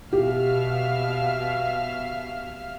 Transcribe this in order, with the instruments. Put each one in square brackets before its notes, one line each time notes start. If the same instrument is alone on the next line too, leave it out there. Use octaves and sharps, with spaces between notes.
[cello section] B2 [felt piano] G4 [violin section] E5 F5 F6